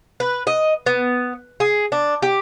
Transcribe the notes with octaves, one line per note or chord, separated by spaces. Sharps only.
B4
D#5
B3
G#4
D4
G4